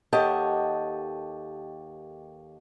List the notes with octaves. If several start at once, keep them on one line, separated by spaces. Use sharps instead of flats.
D#2 G4 A4 C#5 D#5 F#5